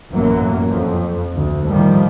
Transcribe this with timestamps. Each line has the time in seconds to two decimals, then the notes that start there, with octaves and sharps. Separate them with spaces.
0.12 A1 F#2 B2 E3 F#3 A#3
0.69 F2
1.35 D2
1.70 A2 D#3 F3 G3